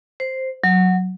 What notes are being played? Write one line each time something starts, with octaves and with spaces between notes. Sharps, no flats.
C5
F#3